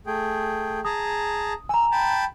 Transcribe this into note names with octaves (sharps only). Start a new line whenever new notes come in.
A3 G#4 G5
G#4 A5 A#5 D#6
G#5 A#5 E6
G5 A5 B5